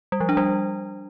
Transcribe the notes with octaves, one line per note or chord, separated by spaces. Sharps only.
G3
F3
D4
G3